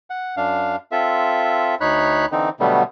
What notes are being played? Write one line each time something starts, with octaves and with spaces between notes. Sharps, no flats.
F#5
F#2 D4 F5
C4 F4 A4 E5
D2 D#4 C#5 B5 F#6
D3 E3 C4 D#4
B2 D3 F#3 G3 A3 B3